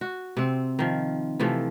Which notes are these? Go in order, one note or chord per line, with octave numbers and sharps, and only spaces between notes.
F#4
C3 C4
D#3 F3
C3 E3 F3 A3